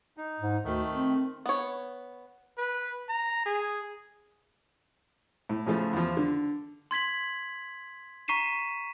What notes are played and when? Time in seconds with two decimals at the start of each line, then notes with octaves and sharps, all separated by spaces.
0.17 D#4
0.39 G#2
0.64 D2 D#3 A3
0.93 C4
1.46 B3 C#5
2.57 B4
3.09 A#5
3.45 G#4
5.49 A2
5.66 A2 C#3 F3 A3
5.93 E2 F3
6.17 D3
6.91 C6 G#6 B6 F#7
8.28 A#5 C#6 B6 C7 D#7 E7